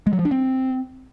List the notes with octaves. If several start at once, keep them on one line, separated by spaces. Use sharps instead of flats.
G#3
F#3
F3
D4
C4